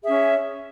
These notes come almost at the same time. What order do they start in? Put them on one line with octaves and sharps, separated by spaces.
G#4 E5 C#4 C#5